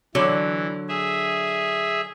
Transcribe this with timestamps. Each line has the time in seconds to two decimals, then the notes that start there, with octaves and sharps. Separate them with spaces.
0.15 D3 E3 F#3
0.89 G#4 E5